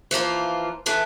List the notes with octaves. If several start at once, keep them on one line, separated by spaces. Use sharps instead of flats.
E3 F3 A#3 F4
E3 A3 B3